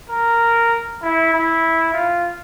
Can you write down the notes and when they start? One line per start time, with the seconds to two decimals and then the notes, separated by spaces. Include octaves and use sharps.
0.10 A#4
1.02 E4
1.33 E4
1.93 F4